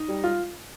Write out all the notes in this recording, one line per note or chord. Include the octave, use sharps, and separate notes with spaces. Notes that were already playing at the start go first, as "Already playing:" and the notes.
Already playing: D#4
G3
F4